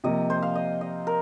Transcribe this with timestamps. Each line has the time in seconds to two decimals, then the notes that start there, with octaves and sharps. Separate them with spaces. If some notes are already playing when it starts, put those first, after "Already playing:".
0.04 C3 F3 A#3 D#5
0.30 C5
0.43 F5
0.55 D#5
0.81 D#5
1.07 A#4